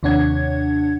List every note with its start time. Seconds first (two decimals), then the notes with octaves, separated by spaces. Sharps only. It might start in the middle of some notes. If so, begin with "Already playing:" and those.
0.03 D#2 C3 D4 C#5 F#5 G#6